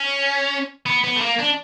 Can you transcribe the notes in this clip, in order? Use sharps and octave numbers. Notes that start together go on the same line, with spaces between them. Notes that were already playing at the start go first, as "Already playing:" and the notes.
Already playing: C#4
B3
B3
A3
A#3
D4